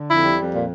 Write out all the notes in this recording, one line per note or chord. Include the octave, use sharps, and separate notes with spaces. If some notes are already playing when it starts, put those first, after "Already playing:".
Already playing: D3
F2 E4
G3
F2
A#2